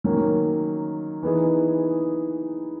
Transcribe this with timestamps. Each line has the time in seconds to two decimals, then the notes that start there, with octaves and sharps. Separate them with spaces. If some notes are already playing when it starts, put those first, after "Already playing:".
0.04 D#3 F#3 A#3 C#4
1.23 E3 B3 D#4 G#4